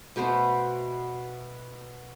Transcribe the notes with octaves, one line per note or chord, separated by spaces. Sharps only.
B2 A3 B3 C5